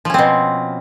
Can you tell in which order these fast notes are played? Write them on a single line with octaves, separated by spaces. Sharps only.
F3 C#4 C4 B2